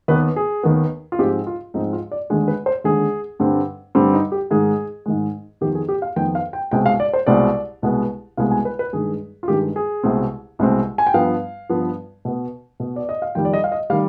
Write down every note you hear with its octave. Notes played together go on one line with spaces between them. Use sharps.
D#2 D#3 B3 B4
G#4
D#2 D#3 B3
F4
G#2 F3 G#3 C4 G4
F4
G#2 F3 G#3 C4 D#4
F4
D5
D#2 D3 G#3 G#4
B4
C5
D#2 D3 G#3 G#4
G2 D3 G3 C4
G2 D3 G3 C4
D#4
G4
G#2 D#3 G#3 G#4
G#2 D#3 G#3
F2 D#3 B3 G4
G#4
G4
F5
F2 D#3 B3 G5
F5
G5
C2 B2 G#3 C4 G5
F5
D5
C5
C2 B2 G#3 C4 D5
C2 B2 G#3 B3
C2 B2 G#3 B3 F5
G#5
B4
B4
G2 D#3 G#3 G#4
F4
G2 D#3 G#3 G4
G#4
C2 B2 G#3 C4
C2 B2 G#3 C4
G#5
G5
G2 F3 B3 F5
G2 F3 B3
B2 B3
B2 B3
D5
D#5
F5
F2 D#3 G3 G5
D5
D#5
F5
D#5
D#3 G3 F5